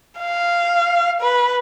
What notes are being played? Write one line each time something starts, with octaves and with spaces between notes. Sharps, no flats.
F5
B4